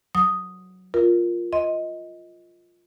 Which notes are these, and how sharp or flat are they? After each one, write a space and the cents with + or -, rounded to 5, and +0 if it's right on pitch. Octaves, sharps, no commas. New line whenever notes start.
F#3 +0 D#6 +0
F4 +0 A#4 +10
D#5 +15 C6 +0